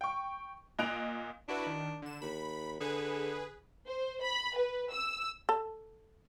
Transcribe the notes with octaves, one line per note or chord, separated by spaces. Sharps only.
G5 C#6
A#2 D#5 F#6 D7 F7
D4 E4 F#4 B4
D#3
D3 E7
D#2 B5
D3 G#4 B4
C5
B5
B4
E6
A4